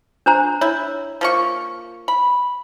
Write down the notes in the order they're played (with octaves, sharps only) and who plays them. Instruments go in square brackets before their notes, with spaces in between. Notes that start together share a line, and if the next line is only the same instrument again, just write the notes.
[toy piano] D4 C5 A#5
[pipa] E4 [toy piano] C#5
[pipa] F3 A#3 C#6
B5